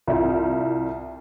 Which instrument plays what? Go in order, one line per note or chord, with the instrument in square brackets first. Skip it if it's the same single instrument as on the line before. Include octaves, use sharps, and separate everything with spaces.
[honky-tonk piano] C2 E4 F4